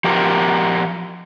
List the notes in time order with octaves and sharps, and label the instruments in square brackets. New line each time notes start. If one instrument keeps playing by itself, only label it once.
[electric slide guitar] F3 G4 A#4